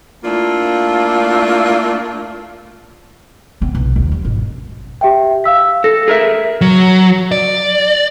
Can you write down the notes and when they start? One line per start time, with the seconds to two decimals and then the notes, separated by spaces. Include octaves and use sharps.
0.24 A3 A#3 D4 E4 F4
3.62 B3 C4
3.75 B1
3.96 D#2
4.12 F#2
4.24 G#1 B2
5.01 G4 E5 G5
5.44 F5 E6 B6
5.84 A4 A#6
6.08 G#4 A#4 E5
6.61 F#3
7.32 D5